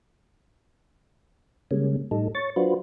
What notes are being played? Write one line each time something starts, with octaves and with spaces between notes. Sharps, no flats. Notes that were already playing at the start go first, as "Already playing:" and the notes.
C#3 G3 G#3 A#3 C#4
A2 G3 D#4 A4
C#5 C#6 A6
F#3 D4 F4 F#4 B4 C5